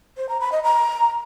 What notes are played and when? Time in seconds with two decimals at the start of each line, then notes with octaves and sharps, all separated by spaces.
0.17 C5
0.29 A#5
0.40 B5
0.52 D#5
0.64 A#5